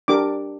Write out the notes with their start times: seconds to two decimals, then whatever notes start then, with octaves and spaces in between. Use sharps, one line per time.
0.08 D4 G4 A#4 D6